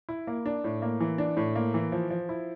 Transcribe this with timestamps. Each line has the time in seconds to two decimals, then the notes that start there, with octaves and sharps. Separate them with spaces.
0.09 E4
0.27 A#3
0.46 D4
0.64 A2
0.82 A#3
1.00 E3
1.18 D4
1.37 A2
1.56 A#3
1.74 E3
1.92 F3
2.10 F3
2.29 E4